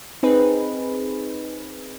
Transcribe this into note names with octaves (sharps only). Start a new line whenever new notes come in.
C4 D#4 G#4 B4